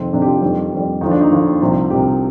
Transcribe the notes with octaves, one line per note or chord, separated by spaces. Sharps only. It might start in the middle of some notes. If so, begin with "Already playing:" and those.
Already playing: F2 C3 D#3 C4
F2 C3 D#3 D4
G4
F4
F2 D#3 G3
F2 D#3 G3
D#2 D3 F3 D#4
D4
D#4
D#2 D3 F3
C2 C3 F3
C2 C3 F3 G4